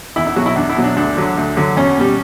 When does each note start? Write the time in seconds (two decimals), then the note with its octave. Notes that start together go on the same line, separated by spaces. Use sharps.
0.16 E2 E4
0.27 E4
0.36 B2 F#3 F#4
0.46 E4
0.56 E2 D4
0.70 E4
0.77 B2 F#3
0.84 D4
0.96 D2 D4
1.17 D3 F#3
1.37 D2
1.57 D3 F#3
1.77 E2 C#4
1.97 B2 G3